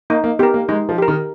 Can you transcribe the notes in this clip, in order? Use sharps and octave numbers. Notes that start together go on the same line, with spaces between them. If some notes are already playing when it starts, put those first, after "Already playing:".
A#3 D#4
A#3
B3 G4 A#4
A#3
G#3 D#4
F3
G4 A#4
D#3